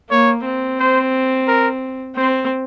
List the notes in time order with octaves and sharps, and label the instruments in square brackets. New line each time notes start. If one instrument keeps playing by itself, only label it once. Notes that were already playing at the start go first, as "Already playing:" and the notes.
[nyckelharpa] A#3 [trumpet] C#5
[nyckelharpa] C4
[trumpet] C5
A#4
[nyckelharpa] C4 [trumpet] C5